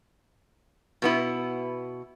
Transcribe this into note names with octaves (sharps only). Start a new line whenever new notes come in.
B2 B3 E4